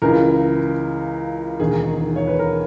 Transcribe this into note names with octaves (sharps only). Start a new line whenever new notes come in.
C#2 C#3 E3 A#4
E1 D#2 D#3 G#4
C#5
B4
A#4